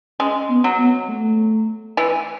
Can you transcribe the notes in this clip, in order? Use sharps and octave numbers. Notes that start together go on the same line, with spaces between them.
G#3 C#4
B3
F#3
B3
A3
E3